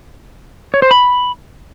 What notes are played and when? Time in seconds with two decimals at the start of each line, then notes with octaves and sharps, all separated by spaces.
0.74 C#5
0.82 C5
0.91 B5